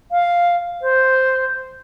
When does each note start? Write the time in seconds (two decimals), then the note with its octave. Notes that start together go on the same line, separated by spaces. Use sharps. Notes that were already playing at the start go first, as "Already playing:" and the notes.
0.11 F5
0.82 C5